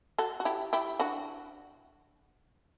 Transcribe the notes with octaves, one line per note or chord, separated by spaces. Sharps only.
F#4 A4
F#4
E4 G4
E4 G4
D4 F#4